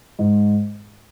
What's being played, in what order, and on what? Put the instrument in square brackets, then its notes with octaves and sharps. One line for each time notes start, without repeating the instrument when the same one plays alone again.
[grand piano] G#2